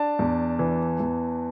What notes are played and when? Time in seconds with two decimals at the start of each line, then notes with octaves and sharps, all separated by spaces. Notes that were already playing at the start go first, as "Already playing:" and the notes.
Already playing: D4 A5
0.19 E2
0.59 E3
1.00 E2